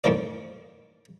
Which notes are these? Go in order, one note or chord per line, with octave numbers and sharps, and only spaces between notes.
F2 A2 D#3 F3 A#3 D5